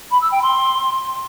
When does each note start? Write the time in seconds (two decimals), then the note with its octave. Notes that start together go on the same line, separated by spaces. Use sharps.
0.11 B5
0.21 E6
0.32 G5
0.42 C6